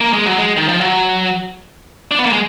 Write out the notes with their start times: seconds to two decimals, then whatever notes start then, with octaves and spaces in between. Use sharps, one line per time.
0.01 A#3
0.13 G#3
0.26 F#3
0.39 G#3
0.57 D#3
0.68 F3
0.81 F#3
2.11 D4
2.19 B3
2.26 A#3
2.33 G#3